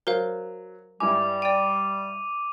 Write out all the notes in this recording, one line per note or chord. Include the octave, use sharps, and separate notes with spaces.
F#3 A#4 C5 F5
G2 G3 E4 G#5 D6
D5 G5 D#7